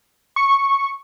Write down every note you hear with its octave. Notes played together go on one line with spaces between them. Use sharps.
C#6